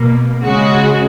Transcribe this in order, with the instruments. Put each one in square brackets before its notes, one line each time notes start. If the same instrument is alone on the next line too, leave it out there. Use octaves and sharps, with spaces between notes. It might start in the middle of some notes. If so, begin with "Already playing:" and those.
Already playing: [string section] B2 A#3
C#3 G#3 F#4